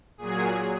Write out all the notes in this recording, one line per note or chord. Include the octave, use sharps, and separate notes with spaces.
A#2 F#3 G#4